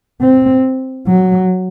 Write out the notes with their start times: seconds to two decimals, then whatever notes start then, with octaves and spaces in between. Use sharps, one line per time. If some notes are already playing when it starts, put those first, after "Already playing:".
0.21 C4
1.07 F#3